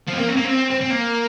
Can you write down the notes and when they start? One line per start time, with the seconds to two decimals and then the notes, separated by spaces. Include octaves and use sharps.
0.08 F3
0.13 C4
0.18 A#3
0.29 C4
0.36 A#3
0.45 C4
0.71 C4
0.81 C4
0.90 A#3